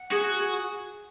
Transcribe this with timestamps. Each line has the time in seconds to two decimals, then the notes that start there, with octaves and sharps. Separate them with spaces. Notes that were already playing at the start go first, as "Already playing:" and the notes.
Already playing: F#5
0.11 F#4 G#4
0.40 G#4